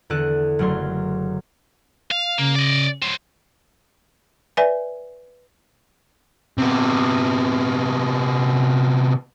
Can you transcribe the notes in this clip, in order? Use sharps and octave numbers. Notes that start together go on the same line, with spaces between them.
E2 D3 D4 A4 F#6 D#7
F#1 F#2 F#3 A3 G#4 C6
F5
C#3 A#3
D5 D#5
F#3 C4
B4 D5 E5 G#5
C3 B3